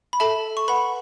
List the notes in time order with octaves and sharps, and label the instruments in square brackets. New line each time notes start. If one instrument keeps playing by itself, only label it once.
[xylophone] B5
A4 E5 A5
C#6
B4 F#5 B5